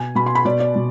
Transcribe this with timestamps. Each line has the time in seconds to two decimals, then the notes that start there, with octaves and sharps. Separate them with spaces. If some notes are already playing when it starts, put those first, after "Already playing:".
Already playing: B2 G#5
0.15 B2 B5
0.26 C6
0.35 B5
0.45 B2 D5
0.60 D5
0.76 B2